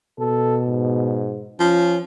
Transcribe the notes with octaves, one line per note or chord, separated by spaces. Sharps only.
B2 A4
G#2
F3 C#4